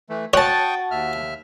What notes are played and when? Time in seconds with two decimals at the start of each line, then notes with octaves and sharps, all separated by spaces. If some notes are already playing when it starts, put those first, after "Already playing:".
0.10 E3 A3
0.34 F#4 C#5 G5 A5 C#6 D#6
0.91 D#2 E5 F6